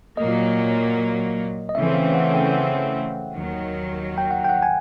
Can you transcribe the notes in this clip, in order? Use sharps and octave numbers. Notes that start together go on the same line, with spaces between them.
A#2 F#3 A#3 D#5
D#5
C#3 E3 A3 C4 E5
F5
F#5
G5
F#5
D#2 D#3 F#3
G5
F#5
G5
F#5
G#5